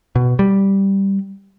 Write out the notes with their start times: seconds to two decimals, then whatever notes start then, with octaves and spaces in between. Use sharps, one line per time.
0.16 B2
0.39 G3